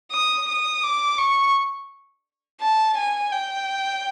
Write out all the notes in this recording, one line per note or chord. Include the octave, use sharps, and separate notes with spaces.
D#6
D#6
D6
C#6
A5
G#5
G5